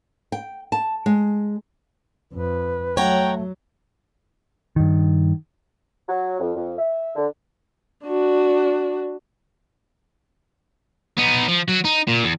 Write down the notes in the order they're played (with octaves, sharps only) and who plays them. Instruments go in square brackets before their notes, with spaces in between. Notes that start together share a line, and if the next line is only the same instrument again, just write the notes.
[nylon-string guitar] G5
A5
G#3
[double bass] F2 [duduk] B4
[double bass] F#3 [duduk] A3 [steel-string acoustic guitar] C#5 F#5 A#5 [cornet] G5
[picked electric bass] G2 D#3
[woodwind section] F#3
F2
F2
E5
D3
[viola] D4 F#4
[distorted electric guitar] B3 D#4
F3
F#3 F#4
D#4
A#2
E2